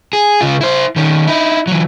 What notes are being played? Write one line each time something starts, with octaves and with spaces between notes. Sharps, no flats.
G#4
C#3 F4
E4 C5
D#3 C#4
D#4 E4
E3 F#3